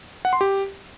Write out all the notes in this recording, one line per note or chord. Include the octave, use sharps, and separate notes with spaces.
F#5
C6
G4